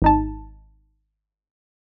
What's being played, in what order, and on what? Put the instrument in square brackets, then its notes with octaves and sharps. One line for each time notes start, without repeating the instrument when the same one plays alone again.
[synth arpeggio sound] G#1 D#4 A5